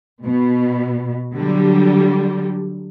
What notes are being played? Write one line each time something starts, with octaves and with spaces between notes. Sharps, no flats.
B2
D3 F#3 G3